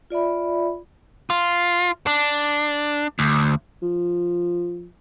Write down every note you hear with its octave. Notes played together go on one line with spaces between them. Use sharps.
F4 D5 E5 B5
F4
D4
D2
F3